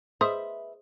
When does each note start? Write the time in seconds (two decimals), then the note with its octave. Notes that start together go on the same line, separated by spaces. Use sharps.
0.21 G#4 B4 C5 D#5 E5 D#6